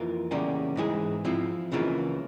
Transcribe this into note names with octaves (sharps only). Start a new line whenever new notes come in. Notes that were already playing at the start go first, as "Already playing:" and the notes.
Already playing: F2 E3 A#3 F4 A#4
E2 C#3 G3 A#3 C#4
G#2 E3 G#3 E4 G#4
F3 C4 E4
C#2 C#3 E3 A#3 F4